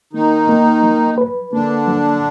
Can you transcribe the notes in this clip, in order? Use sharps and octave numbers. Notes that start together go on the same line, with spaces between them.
D#3 A#3 D#4
A#3
F#3
B4
D3 A#3 D4
F#3